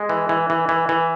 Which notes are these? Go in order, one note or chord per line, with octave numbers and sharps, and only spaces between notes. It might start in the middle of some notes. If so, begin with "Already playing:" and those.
Already playing: G#3
E3
E3
E3
E3
E3